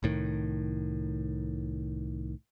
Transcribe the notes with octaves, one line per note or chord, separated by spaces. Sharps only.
C2 A2 D#3